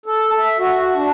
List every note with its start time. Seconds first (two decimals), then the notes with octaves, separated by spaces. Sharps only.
0.06 A4
0.37 E5
0.59 F#4
0.95 D4